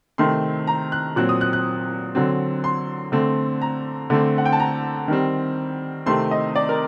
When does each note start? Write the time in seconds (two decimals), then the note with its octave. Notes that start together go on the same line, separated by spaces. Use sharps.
0.18 C3 D#3 A3 C4 C6
0.67 A#5
0.92 F#6
1.16 A#2 F#3 C4 F#6
1.29 D#6
1.41 F#6
1.53 F#6
2.15 D3 F#3 C4
2.64 C6
3.12 D3 A3 C4
3.62 A#5
4.10 D3 A3 C4
4.38 F#5
4.46 G5
4.53 A5
4.60 A#5
5.08 D#3 G3 C4
6.06 C3 D#3 A3 C4 C6
6.31 D#5
6.56 D5
6.69 A#4